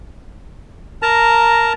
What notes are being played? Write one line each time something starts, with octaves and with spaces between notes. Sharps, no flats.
A#4 A5 A#5